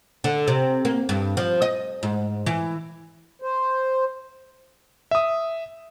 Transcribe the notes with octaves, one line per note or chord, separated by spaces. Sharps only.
D3
C3
A#3
G2
F3
D#5
G#2
E3
C5
E5 D#6